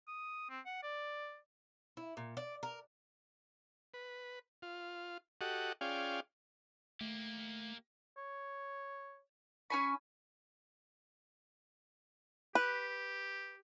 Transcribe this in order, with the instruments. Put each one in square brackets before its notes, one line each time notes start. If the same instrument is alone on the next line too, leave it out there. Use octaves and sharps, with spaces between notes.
[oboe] D#6
C4
F#5
D5
[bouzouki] E4
A#2
D5
A#4
[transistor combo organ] B4
F4
F#4 G4 A4 D#5 F#5
C#4 F4 G#4 D5 F5 G5
[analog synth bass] A3 [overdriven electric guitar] A#3 G4
[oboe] C#5
[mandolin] C#4 G#5 B5 [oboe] C#6
[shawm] G4 [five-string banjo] B4